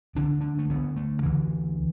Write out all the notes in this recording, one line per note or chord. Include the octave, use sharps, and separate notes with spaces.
D2 D3 D4
D4
A3
D2 D3 B3
A3
D2 D3 E3